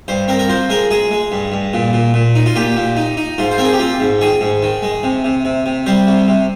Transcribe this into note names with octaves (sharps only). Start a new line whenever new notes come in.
G2 C5
C4 A#4
A#4
F3 C5
G#3 A#4
G#3 G#4
G#3
G2
G2
A#2
A#2
A#2
D#4
F4
A#2 G4
A#2
D#4
D#4
G#2 F4
C5
C4 A#4
G#4
G4
C4 F4
G#2
D#3 G#4
G#2
D#3
G#3
C3
C3
C3
C3
G3 C5
C3
C3